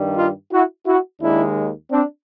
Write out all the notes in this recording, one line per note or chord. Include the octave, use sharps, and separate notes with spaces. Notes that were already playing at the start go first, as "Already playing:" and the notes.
Already playing: G2 D#3 G3
D#4 F4
E4 F#4
E4 F#4
D#2 D#3 G#3 D4 E4
C4 D4